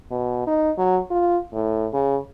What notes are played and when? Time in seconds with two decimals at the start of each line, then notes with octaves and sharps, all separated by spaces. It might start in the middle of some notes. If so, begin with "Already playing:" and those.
0.11 B2
0.47 D#4
0.78 F#3
1.10 F4
1.53 A2
1.93 C#3